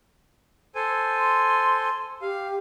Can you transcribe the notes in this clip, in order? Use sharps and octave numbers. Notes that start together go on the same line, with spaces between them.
A4 C5 G#5
C6
G4 F5